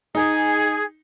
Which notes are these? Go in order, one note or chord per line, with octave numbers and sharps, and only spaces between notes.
D#4 G#4